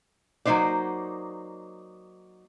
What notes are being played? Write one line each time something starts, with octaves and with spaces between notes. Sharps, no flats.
F#3 A#3 C#4 D#4 C5 D5